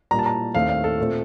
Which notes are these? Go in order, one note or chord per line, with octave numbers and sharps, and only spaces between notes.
A#2 G3 A#3 A#5
A5
A#5
D#2 D#3 A3 C4 F5
F5
A4
A#2 A3 C4